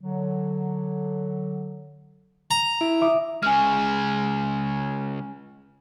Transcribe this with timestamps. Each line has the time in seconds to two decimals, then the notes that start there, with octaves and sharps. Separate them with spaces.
0.01 D3 F#3
2.51 A#5
2.81 E4 D7
3.01 E5 D6 D#6
3.43 C#3 G#3 G#5 F6